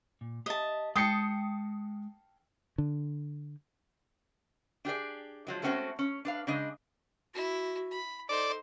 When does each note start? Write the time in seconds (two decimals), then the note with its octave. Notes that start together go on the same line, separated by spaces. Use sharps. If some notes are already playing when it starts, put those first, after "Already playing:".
0.21 A#2
0.46 G4 D#5 E5 A5
0.96 G#3 G5 A5 D#6 C7 C#7
2.78 D3
4.85 D4 G4 G#4 D5
5.47 F3 F#3 G#3
5.62 G#3 A3 C4 C#4 E4 F#4
5.99 C#4
6.25 D4 B4 F5
6.47 C#3 G#3 D4 D#5
7.35 E4 F#4
7.91 B5
8.29 D#4 A4 C5 D5